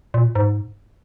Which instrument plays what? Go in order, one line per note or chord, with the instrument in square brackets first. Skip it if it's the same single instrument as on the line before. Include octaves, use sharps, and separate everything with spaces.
[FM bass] A#2
G#2